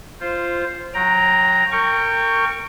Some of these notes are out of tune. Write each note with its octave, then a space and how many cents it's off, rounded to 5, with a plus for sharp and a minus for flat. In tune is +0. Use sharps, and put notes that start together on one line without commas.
F4 -15 C5 +0
F#3 -20 G5 +0 A#5 +0
A#4 -30 G5 +10 C#6 +5